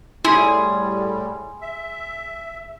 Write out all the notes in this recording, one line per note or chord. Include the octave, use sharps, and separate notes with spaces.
A2 G3 E4 G#4 C6
E5